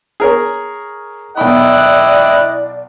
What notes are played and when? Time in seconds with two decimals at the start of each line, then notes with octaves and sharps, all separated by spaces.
0.20 G#4 A#4 C#5
1.37 B1 E4 D5 D#5 G5 B5 F#6